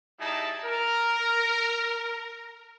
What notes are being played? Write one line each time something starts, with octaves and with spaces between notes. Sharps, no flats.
G3 D#4 E4 G#4 A5
A#4